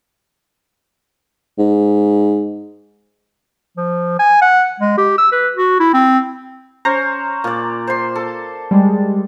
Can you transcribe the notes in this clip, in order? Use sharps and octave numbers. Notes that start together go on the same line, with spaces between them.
G#2
F3
G#5
F#5
G#3
G4
E6
B4
F#4
E4
C4
C#4 C5 A#5
A#2 D5
C5 C6
A4
G3 G#3